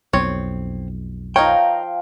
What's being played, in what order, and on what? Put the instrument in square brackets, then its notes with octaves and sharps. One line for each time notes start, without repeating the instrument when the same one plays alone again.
[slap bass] B1 F2 [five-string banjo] C4 C#5
[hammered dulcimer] F3 F5 [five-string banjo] D#4 A#4 C#5 [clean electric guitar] G5